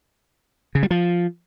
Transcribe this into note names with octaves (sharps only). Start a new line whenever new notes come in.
C#3
G3
F3